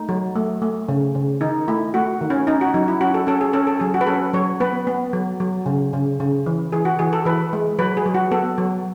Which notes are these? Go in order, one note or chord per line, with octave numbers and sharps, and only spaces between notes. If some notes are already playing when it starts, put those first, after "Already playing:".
Already playing: A3 D#4
F#3
A3
A3
C#3
C#3
D#3 D#4
A3 E4
A3 F#4
D#3
C#4
C#4 D#4
F#4
F#3 D#4
E4
C#4 F#4
A4
C#4 A4
G#4
C#4 A4
A4
F#3 G#4
F#4
B4
C#4 A4
F#3 C#5
B3 B4
B3
F#3
F#3
C#3
C#3
C#3
E3
E3 G#4
F#4
E3 G#4
A4
E3 B4
G#3
F#3 B4
G#4
F#3
F#4
B3 A4
F#3